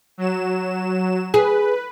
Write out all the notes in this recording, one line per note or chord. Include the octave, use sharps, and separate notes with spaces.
F#3 E7
G#4 B4